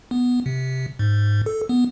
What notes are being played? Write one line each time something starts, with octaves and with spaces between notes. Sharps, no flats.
B3
C3
G#2
A4
B3